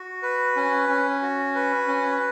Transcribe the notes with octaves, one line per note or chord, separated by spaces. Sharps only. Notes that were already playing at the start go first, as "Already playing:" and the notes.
Already playing: F#4
B4
C#4
C#4
F#4
B4
C#4